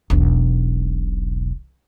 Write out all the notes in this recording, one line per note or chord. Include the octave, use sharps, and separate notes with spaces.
E1 B1